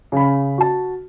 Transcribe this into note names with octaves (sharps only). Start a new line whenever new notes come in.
C#3 B5
F#4 A5